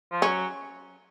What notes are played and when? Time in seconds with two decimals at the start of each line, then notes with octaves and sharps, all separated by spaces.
0.12 F3
0.22 F#3 C#4